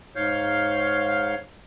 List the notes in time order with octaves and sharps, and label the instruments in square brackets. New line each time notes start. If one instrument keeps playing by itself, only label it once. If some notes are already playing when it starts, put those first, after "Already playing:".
[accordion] G#2 C#5 F5 G6